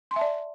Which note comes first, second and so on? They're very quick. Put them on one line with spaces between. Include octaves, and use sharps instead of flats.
C6 G#5 E5 A5 D5